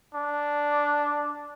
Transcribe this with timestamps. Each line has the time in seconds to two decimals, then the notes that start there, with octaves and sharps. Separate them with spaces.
0.15 D4